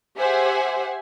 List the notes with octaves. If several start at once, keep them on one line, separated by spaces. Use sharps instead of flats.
G4 G#4 C5 E5 F#5 G#5